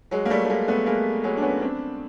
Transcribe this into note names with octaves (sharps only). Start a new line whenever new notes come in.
F#3 G#3
A#3
G3 A3
A3
G#3 A#3
A3 B3
G#3 A#3
F#3 G#3
D4
B3 C#4
C4 D4